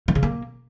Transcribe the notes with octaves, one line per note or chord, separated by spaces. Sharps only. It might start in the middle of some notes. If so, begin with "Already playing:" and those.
D#3
C#3
A#3